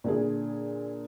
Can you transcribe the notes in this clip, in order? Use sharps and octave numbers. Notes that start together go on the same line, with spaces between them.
A#2 D3 G#4